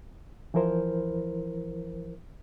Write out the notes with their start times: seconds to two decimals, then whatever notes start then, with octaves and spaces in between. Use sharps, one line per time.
0.54 E3 F3 E4 A#4 C5